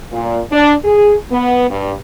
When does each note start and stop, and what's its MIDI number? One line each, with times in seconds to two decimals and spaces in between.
0.12 0.40 46
0.52 0.72 62
0.84 1.15 68
1.31 1.66 59
1.70 1.94 43